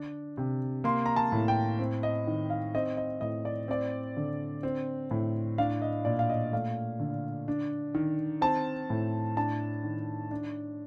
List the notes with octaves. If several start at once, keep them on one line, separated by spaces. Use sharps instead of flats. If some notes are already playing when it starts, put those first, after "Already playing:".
Already playing: D3 D4
C3
A#3 C6
A#5
A5
A2
G5
C4
D#5
D#3
F5
C4 D#5
D#5
A2 D#5
D5
C4 D5
D3
C4
A2
D4 F5
D#5
A#2 D5
F5
D#5
A3 F5
D3
D4
D#3
C4 A5
A2
D4 A5
D#3
D4